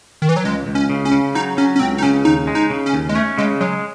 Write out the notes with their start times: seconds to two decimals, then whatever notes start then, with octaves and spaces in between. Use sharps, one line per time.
0.22 D#3
0.29 E3
0.37 F#3
0.44 C#2 G#3
0.67 C#2
0.75 C#4
0.90 C#3
1.05 C#4
1.12 C#3
1.35 F#3 D#4
1.57 F#3 C#4
1.76 C#4
1.79 C#2 C4
1.98 D#4
2.03 C#3 C#4
2.25 D#2 D#4
2.47 G#3
2.55 D#4
2.70 C#3
2.86 C#4
2.93 D#2
3.09 G#3
3.15 A3 C#4
3.38 C#3 G#3
3.61 F#3 G#3